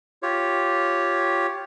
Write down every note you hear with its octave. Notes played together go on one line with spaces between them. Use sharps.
F4 G4 C#5